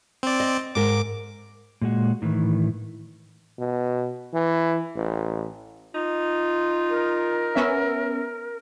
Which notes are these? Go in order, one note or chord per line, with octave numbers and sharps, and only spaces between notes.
C4 D5
D#5
G#2 A#4 D6
A#2 G#3 F#4
A2 D#3 E3
B2
E3
A1
D#4 F4
A#4
B3 C#4 E5